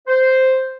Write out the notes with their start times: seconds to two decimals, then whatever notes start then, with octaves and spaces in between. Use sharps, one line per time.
0.07 C5